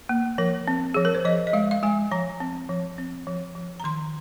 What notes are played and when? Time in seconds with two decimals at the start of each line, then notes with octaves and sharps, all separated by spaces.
0.09 A#3
0.38 F3 A#4
0.68 C4
0.94 F3 G#4
1.05 A#4
1.15 C5
1.25 F3 D#5
1.47 D#5
1.53 G#3 F5
1.71 F5
1.83 G#3 G#5
2.12 F3 A#5
2.40 C4
2.69 F3
2.98 C4
3.27 F3
3.55 F3
3.80 A#5
3.84 D#3 C6